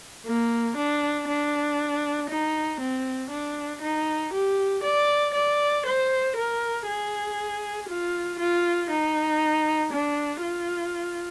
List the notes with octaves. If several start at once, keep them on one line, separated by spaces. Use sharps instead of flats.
A#3
D4
D4
D#4
C4
D4
D#4
G4
D5
D5
C5
A#4
G#4
F4
F4
D#4
D4
F4